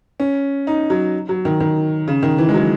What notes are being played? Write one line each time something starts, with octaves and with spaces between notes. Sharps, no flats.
C#4
D#4
F#3
F#3
D#3
D#3
C#3
D#3
E3
G#3
F#3